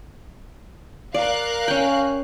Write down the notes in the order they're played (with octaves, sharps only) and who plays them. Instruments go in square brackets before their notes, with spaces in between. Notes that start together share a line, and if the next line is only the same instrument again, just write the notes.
[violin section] A#4 F5 F#6 [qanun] D5
[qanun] C#4 G5